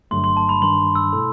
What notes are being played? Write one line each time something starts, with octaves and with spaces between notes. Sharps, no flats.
G1 G2 F#3 A3 C6
C6
A5
B5
G2 D#3 G3 C6
E6
B2 A3 E4 A4